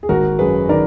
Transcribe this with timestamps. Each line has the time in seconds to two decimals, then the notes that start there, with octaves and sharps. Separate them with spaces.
0.03 G#4
0.09 G#1 F#4 A#4
0.39 F#2 G#4 B4
0.69 D#3 A#4 D5